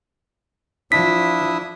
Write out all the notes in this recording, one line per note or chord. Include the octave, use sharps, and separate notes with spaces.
F3 D4 E4 D#6 B6